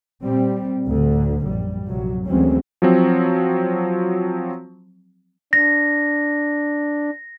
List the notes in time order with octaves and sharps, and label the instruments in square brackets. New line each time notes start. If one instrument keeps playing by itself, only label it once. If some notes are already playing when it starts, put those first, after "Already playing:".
[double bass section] A#2 G3 C4
D2 A2 D3
A#1 F#2 G3
A#1 F#2 C3 F#3
D2 E3 F#3 G#3 C4 C#4
[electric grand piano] F3 F#3 C4
[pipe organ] D4 [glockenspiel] A#6